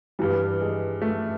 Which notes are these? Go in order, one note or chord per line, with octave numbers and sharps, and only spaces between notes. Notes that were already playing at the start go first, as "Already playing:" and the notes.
G2 E3 G3
G#3
A3